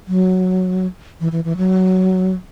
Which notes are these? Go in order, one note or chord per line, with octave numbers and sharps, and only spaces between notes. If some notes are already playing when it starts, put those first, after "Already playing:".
F#3
E3
E3
E3
F#3